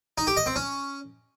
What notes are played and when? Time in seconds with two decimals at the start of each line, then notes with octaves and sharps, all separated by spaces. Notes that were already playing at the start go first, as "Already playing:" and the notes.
0.18 D#4
0.27 G4
0.37 D#5
0.46 C4
0.56 C#4